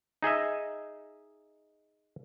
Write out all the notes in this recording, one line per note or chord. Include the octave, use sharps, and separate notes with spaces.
D#4 G#4 D#5 E5